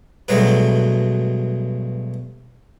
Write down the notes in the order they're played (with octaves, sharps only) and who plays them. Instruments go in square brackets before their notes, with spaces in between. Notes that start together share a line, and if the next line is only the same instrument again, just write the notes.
[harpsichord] G2 B2 F#3 G#3 A3